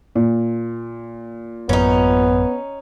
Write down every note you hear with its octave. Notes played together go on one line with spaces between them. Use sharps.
A#2
A1 F#2 B3 C#4 D#4